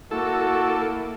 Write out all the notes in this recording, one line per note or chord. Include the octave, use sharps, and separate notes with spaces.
A#3 E4 F#4 A4